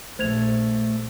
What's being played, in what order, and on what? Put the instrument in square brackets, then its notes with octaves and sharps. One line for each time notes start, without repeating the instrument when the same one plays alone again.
[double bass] A#1 [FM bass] A3 [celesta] C5 G#6 F7